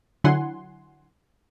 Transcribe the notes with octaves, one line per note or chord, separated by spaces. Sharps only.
D3 F#3 E4 F#5 G#5 C6